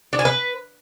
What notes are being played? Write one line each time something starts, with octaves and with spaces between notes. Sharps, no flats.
D4
G#5
B4